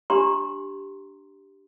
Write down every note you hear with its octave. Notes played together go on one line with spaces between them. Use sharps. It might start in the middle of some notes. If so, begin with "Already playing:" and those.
D4 G4 A#5 C6